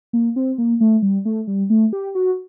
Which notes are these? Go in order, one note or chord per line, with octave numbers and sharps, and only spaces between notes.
A#3
C4
A#3
A3
G3
A3
G3
A3
G4
F#4